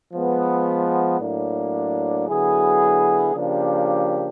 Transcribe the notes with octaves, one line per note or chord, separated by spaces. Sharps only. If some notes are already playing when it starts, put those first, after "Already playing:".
F3 G#3 B3
A2 F#3 A#3 D4
D3 F#3 B3 E4 G#4
C#3 F3 A#3 D4 G4